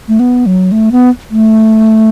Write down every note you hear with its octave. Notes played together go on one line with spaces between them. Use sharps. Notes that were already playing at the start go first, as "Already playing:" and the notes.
A3
B3
F#3
A3
B3
A3